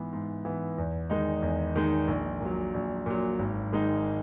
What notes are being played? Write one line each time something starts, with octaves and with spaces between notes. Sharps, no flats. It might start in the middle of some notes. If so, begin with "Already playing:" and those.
Already playing: G#2 E3 B3
G#2
E3 B3
E2
D#3 G#3 D#4
E2
D#3 G#3 D#4
A#1
A#2 F#3
A#1
A#2 F#3
G#1
G#2 D#3 G#3 D#4